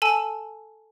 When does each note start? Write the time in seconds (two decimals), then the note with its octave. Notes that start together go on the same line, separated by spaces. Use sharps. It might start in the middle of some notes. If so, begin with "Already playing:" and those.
0.02 A4 G#5 A5 E6